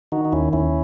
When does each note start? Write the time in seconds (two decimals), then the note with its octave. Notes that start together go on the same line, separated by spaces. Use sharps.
0.12 D#3 D#4 F#4
0.25 D#4
0.32 D#2 C#4 E4
0.53 D#2 C#4 E4